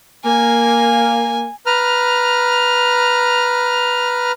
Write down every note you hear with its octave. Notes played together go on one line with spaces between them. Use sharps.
A#3 G#5
B4 A#5 F6